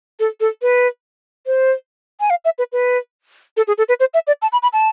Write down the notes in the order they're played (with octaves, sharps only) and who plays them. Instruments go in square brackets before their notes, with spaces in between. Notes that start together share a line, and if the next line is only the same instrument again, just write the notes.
[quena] A4
A4
B4
C5
G#5
F5
E5
B4
B4
A4
G#4
A4
B4
C5
E5
D5
A5
B5
B5
A5